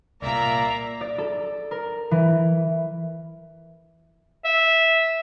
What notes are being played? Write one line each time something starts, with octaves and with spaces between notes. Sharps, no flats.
C2 A#2 A#3 D5 E5 A#5
D5
A4
A#4
E3
E5